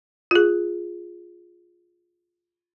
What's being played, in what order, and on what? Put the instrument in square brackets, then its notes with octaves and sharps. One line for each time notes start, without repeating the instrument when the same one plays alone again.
[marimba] F4 G#4